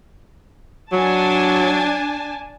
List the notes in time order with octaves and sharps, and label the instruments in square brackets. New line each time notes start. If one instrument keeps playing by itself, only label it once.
[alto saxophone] F#3 [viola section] D4 G#5 A5